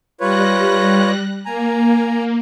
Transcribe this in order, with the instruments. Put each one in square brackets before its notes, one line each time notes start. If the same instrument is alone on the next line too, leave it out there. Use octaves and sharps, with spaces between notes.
[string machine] G3 F#6 A#6 [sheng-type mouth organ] F4 B4 C#5
[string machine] A#3 [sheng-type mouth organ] G#5 A#5